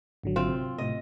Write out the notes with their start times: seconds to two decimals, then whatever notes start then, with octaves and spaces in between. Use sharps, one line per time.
0.24 G#1 D3 F#3
0.36 C4 F4
0.49 C3
0.78 A2 C3 D#5